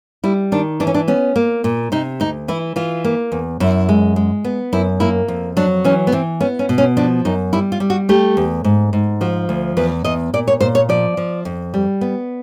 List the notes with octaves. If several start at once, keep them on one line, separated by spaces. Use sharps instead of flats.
G3 E4
D#3 D4
E3 D4
C#4
D4
B3 C#4
A#3
A#2
C3 D#4
D2 D#4
E3 E4
E3 F4
A#3
E2
F#2 E4
G#3
G#3
B3
F#2 E4
A#3 E4
F2
F#3 D4
E3 C#4
B3
E3 C4
B3 C#4
C#4
B2
C#4
F3 D4
F#2 D#4
G3 E4
F4
G3
F#4
A3 G4
E2
G#2
G#2
F3 F#4
D2
E2 B4
E2 D#5
A#2 D5
C#5
A#2 C5
C#5
F3 D5
F3
F2
G3
B3